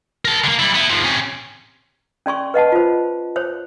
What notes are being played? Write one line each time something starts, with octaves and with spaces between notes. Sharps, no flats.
A#4 A5
D3 A#3
G3 E4
B3 E4
G#2 F3
C3 C#4
C#4 D5 C6 C#6
B4 D#5 F#5 A5
F4 C5
C5 C#5